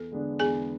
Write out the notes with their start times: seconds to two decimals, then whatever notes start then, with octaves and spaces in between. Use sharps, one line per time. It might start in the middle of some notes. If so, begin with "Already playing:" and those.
Already playing: E2 A4
0.12 D3 G#3 B3 D4
0.39 E2 G#4 G#5